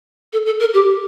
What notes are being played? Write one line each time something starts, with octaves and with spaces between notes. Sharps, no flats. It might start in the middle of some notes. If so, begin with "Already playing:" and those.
A4
A4
A#4
G4